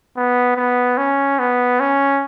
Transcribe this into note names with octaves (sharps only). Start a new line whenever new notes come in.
B3
B3
C#4
B3
C#4